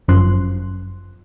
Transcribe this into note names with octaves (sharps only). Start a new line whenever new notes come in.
G1 F#2 F3 C6 F#6